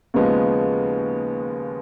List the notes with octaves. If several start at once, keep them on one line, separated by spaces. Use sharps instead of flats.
D#2 C#3 F3 G#3 B3